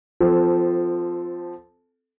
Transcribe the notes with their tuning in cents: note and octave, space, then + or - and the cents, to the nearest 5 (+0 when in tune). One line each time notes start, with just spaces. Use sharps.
F3 +0 C4 -20 A4 -5